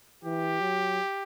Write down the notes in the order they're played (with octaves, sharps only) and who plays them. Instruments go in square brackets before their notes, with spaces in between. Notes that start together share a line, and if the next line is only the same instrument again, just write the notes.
[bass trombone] E3 [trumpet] G4
[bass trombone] F#3